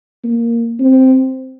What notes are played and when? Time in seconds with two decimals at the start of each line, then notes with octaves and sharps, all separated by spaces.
0.24 A#3
0.80 C4